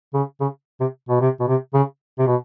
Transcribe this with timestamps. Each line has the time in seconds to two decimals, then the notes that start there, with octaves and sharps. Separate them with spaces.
0.14 C#3
0.41 C#3
0.80 C3
1.09 B2
1.21 C3
1.40 B2
1.48 C3
1.74 C#3
2.19 C3
2.27 B2